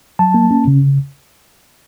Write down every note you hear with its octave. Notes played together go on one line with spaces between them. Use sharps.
F#3 A5
A#3
C#4
C#3